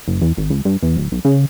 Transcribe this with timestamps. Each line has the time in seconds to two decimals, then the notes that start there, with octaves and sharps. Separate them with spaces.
0.08 F#1
0.21 E2
0.37 G#1
0.50 C#2
0.65 G2
0.82 E2
0.97 D1
1.12 B1
1.25 C#3